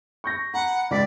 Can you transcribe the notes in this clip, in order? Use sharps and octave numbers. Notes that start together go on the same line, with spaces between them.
C#6 G6 A#6
F#5 A#5 B5
C#2 D5 D6 B6